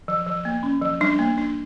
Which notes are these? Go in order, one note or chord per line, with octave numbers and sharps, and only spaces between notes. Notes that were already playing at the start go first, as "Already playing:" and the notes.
F3
F3
A#3
C#4
F3
G3 D4
A#3
D4